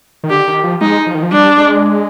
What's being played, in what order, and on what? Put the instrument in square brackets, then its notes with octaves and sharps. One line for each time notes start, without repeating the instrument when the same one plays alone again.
[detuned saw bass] D#3
[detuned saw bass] D3 [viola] G4
[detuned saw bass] D#3
F3
[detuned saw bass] G#3 [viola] D#4
[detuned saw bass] F3
D#3
F3
[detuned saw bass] G3 [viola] D4
[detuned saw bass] G#3